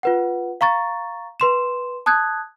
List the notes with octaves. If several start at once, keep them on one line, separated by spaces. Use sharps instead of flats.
F4 B4 F#5
F5 A#5 C#6 A6
B4 C6 E7
A5 D#6 F#6 G#6